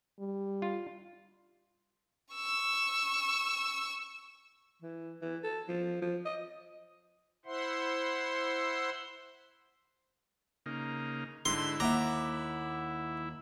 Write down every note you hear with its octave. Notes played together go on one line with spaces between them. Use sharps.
G3
F4
C#6 E6
E3
E3
A4
F3
F3
D#5
E4 C5 E5 F#5 C6
C#3 A#3 D#4
G#2 D3 E4 C6
D#2 E5 F#5 A#5 D6